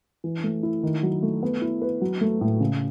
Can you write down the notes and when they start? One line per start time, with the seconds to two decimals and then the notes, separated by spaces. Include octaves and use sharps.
0.24 E3
0.44 A3
0.63 E4
0.83 D#3
1.03 F#3
1.23 A3
1.43 B3
1.62 E4
1.82 B4
2.01 F#3
2.21 A3
2.41 A2
2.60 C#3